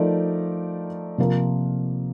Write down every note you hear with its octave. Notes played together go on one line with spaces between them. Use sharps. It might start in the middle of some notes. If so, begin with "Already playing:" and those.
Already playing: F3 A3 D#4 A#4 D5
C3 F3 A#3 F4 A#4